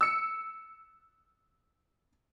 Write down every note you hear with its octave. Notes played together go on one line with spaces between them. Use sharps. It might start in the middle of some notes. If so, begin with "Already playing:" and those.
E6 C#7